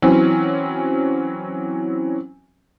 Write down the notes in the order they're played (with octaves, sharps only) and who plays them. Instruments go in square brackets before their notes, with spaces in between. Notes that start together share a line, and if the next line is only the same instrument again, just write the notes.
[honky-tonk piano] E3 F#3 C4 C#4